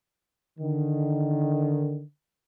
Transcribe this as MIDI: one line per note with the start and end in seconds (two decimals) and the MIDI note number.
0.59 2.02 50
0.59 2.02 51